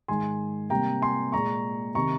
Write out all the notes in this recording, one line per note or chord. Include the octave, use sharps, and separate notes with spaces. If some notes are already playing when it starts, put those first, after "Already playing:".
G#2 D#3 G#3 G#5 C6
C3 G3 A#3 G5 A#5
G#5 C6
A#2 G#3 A#5 C#6
C3 D#3 A#5 C#6